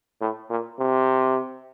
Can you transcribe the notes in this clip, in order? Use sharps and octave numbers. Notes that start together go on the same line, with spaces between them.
A2
A#2
C3